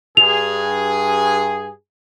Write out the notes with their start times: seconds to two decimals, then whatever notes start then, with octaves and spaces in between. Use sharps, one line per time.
0.17 G2 G#4 F7